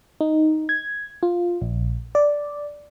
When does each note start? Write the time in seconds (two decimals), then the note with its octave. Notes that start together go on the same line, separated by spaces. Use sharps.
0.21 D#4
0.69 G#6
1.23 F4
1.61 A#1
2.15 D5